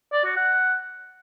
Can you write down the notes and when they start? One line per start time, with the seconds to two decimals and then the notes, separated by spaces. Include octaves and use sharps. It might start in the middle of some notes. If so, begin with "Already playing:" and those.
0.13 D5
0.25 F#4
0.37 F#5